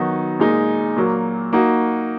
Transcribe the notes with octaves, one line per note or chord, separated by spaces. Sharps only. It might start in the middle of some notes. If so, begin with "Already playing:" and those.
Already playing: D#3 F#3 B3 D#4 F#4
A#2 G#3 D#4
A#2 F#3 A#3
A#3 D#4 F#4